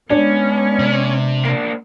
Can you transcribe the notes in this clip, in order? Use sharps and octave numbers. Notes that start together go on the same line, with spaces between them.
G#3 B3 C#4 D4
C3
A#3 D4